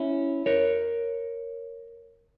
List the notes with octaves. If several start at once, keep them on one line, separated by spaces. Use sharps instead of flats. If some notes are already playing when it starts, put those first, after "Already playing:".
Already playing: C#4 E4
A#4 C#5